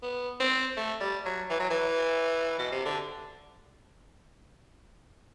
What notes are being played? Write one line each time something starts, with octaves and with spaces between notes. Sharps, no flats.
B3
C4
A3
G3
F#3
E3
F#3
E3
B2
C3
D3